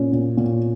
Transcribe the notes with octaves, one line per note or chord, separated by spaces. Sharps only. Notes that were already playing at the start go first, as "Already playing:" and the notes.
Already playing: A#2 C#4
A#2
A#2